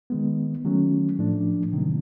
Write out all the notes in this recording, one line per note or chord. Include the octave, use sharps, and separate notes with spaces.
D#3 G#3 B3
D#3 F#3 A3 C#4
A2 F3 A3 D4
C3 D#3 F#3 A#3